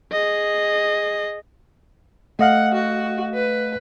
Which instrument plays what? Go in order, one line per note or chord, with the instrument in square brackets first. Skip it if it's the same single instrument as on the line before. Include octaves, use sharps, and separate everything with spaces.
[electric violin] G#4 D#5
[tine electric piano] A3 D#5 F5 [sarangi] F#5
[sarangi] F#4
B4